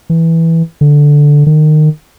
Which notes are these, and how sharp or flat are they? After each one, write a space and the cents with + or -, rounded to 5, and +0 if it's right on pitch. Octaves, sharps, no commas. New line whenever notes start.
E3 -5
D3 -5
D#3 -25